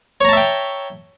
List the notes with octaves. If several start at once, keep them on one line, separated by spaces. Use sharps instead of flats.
C#5 E5 G5 A5 A#5